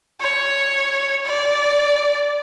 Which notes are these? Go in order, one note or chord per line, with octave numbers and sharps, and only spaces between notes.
C#5
D5